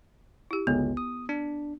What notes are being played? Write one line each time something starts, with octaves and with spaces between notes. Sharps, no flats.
E4 G4
G1 C#2 B3
D#6
D4